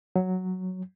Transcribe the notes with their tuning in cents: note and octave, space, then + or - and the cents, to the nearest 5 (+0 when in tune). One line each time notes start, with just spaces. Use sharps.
F#3 +0